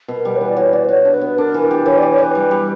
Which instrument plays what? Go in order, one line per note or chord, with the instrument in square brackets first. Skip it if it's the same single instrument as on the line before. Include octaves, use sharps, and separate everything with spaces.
[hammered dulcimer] B2
[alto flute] A#4
[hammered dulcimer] G3
[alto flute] C#5
[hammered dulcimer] E3 [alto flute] B4
[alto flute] D5
[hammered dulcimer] F#4 [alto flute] C#5
[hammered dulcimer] F#4 [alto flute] D5
[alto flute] B4
[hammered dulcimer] F#4 [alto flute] C#5
[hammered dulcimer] D4
[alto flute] B4
[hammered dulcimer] B3
[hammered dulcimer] D4 [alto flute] A#4
[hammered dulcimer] E3
[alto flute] A#4
[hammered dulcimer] G4
[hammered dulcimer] E3 [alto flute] C#5
[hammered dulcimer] G4 [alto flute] D5
[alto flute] C#5
[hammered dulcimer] E3 [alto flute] B4
[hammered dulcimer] G3
G3